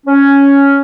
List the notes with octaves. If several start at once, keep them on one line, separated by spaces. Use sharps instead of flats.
C#4